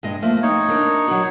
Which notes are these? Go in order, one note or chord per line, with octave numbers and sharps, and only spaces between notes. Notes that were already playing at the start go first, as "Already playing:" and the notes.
G2 G#3 D#5
F3 A3 A#3
C4 D#4 C#5
D4 A#4 D5
F#3 F#4